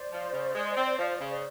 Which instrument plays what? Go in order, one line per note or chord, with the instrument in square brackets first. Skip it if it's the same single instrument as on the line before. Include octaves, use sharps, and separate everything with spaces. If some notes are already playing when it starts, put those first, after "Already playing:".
Already playing: [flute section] C5 D5
[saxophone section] F3
C#3
G#3
C4
F3
C#3